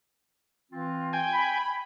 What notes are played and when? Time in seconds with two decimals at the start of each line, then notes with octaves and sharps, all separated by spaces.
0.72 E3 C4 F4
1.13 G5 G#5
1.34 B5